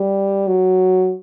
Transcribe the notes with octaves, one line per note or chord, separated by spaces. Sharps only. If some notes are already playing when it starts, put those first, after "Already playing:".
Already playing: G3
F#3